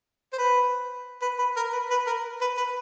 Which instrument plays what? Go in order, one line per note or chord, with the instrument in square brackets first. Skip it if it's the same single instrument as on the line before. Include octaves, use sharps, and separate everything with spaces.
[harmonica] C5
B4
B4
B4
A#4
B4
B4
A#4
B4
B4